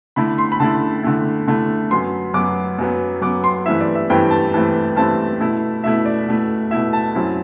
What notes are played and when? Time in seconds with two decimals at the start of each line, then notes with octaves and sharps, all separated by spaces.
0.16 D3 A3 E4 B5
0.38 C6
0.52 B5
0.60 D3 A3 E4 A5
1.03 D3 A3 E4
1.48 D3 A3 E4
1.90 F#2 F#3 B3 C6
2.34 F#2 F#3 B3 D6
2.79 F#2 F#3 B3
3.21 F#2 F#3 B3 D6
3.44 C6
3.66 G2 E3 A3 C4 E4 E5
3.81 D5
3.95 E5
4.10 G2 E3 A3 C4 E4 G5
4.31 A5
4.54 G2 E3 A3 C4 E4 A5
4.96 G2 E3 A3 C4 E4 A5
5.40 B2 A3 E4
5.84 B2 A3 E4 E5
6.05 D5
6.27 B2 A3 E4
6.71 B2 A3 E4 E5
6.93 A5
7.15 F#2 F#3 C4 E4